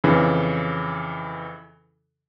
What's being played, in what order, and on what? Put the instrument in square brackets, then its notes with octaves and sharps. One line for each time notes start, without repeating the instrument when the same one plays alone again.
[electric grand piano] F2 C#3 E3